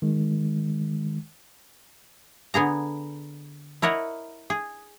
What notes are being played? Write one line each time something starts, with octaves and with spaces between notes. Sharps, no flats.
D#3 G#3
D3 B3 G#4 A#5
E4 A#4 C#5 D#5 F#5
G#4